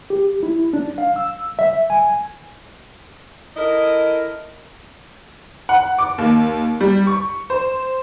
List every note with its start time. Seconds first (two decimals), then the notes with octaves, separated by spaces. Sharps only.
0.10 G4
0.43 E4
0.73 D4
0.98 F5
1.16 E6
1.59 E5
1.90 G#5
3.57 E4 A4 A#4 D#5
5.69 F#5
5.98 D6
6.18 D#2
6.81 G3
7.07 C#6
7.50 C5